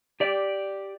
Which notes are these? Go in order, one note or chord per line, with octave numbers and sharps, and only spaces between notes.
G4 D5